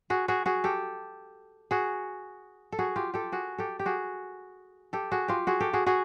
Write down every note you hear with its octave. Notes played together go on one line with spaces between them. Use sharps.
F#4 G#4
F#4 G#4
F#4 G#4
G4 A4
F#4 G#4
A4
F#4 G#4
F4 G4
G4 A4
F#4 G#4
G4 A4
G4
F#4 G#4
G4 A4
F#4 G#4
F4 G4
F#4 G#4
G4 A4
F#4 G#4
F#4 G#4